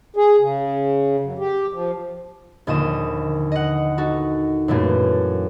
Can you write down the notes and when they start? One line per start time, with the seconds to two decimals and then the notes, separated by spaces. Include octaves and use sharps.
0.16 G#4
0.40 C#3
1.20 F#2
1.39 G4
1.73 F3
2.67 A#1 D#2 D3 D#3 D#6 E7
3.52 D#5 F#5
3.98 D#4 F#4 A4
4.68 F#2 A#2 E3 A3 A#3